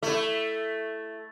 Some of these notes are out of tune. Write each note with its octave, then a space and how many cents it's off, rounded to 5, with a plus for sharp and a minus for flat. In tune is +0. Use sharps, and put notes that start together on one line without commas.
A3 +0 E4 +10